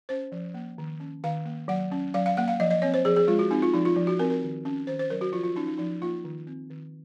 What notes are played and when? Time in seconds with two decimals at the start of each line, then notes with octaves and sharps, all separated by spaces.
0.09 C#4 C5
0.32 F3
0.54 A#3
0.78 D#3
1.00 C#4
1.24 D#3 F5
1.45 A#3
1.68 F#3 F#5
1.92 C#4
2.14 F#3 F5
2.26 F5
2.37 A#3 F#5
2.48 F5
2.60 F3 D#5
2.71 D#5
2.82 C4 C#5
2.94 C5
3.05 F3 G#4
3.16 G#4
3.28 G#3 F4
3.39 F#4
3.51 C4 D#4
3.62 F4
3.74 F3 D#4
3.85 F4
3.96 F3
4.07 F#4
4.19 C4 A#4
4.30 A#4
4.42 D#3
4.65 C#4
4.87 D#3 C5
4.99 C5
5.10 F#3 A#4
5.21 F#4
5.32 F3 F4
5.44 F4
5.56 C#4 D#4
5.67 D#4
5.78 F3 D#4
6.02 A#3 F4
6.24 D#3
6.47 C4
6.70 D#3